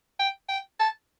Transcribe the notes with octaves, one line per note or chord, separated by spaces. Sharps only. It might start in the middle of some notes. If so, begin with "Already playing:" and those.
G5
G5
A5